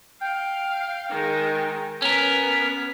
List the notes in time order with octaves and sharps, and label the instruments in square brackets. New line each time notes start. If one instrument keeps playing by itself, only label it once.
[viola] F5 [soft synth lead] G5
[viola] D#3 G#3
[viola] B3 [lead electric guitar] C#4 A#4 [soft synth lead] B6